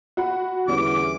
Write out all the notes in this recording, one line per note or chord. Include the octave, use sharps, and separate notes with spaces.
F#4 F#5 B5
E2 D3 E3 G3 C#4 D6